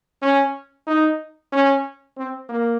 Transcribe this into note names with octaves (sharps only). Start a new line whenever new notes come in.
C#4
D#4
C#4
C4
A#3